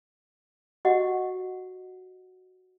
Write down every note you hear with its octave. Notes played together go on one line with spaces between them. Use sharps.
F#4 G4 D#5 F#5